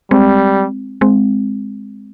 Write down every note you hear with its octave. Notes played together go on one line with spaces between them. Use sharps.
G3 G#3 C4
G#3 C4